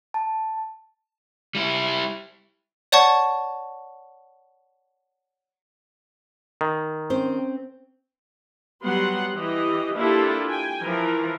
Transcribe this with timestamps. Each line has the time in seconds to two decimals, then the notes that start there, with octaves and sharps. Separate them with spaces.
0.14 A5
1.55 G3 E4
2.92 C#5 D5 F#5 A5 C#6
6.61 D#3
7.10 C4 C#4 C5
8.83 F#3 G3 B3 F#5 C6
9.35 E3 G4 D#5
9.95 A#3 D4 E4 F4 G4 A4
10.48 G5 G#5
10.82 E3 F3 A#4